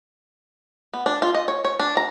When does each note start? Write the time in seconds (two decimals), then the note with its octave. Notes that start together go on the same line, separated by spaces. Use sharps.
0.93 B3
1.06 D4
1.22 F4
1.34 D#5
1.48 C#5
1.65 C#5
1.79 D4
1.97 A#5